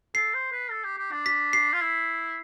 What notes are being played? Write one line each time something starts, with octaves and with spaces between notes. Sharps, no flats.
A4 C7
C5
B4
A4
G4
G4
D4
B6
C7
F4
E4